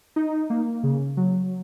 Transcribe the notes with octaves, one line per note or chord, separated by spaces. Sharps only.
D#4
A#3
C#3
F#3